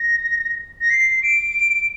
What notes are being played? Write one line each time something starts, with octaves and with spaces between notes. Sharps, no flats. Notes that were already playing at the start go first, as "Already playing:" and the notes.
Already playing: A#6
A#6
C7
D7